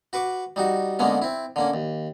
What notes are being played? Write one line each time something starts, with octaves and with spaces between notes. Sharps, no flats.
F#4 B4 C#6 D6
G3 D#4 F#4
D3 G#3 A#3 B3 C#4
C4 E4
D3 A#3 C#4
D#2